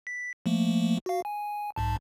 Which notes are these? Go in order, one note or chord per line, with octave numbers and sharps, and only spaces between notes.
B6
F3 A3 A#3
F#4 F5
G#5
B1 G#2 A5